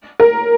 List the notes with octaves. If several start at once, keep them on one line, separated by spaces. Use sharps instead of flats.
A#4